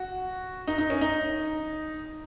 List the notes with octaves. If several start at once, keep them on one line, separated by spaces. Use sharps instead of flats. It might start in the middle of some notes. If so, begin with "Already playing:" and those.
Already playing: F#4
D#4
D#4
C#4
D#4